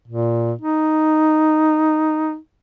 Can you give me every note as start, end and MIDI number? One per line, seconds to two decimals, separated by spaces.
0.08 0.53 46
0.61 2.37 63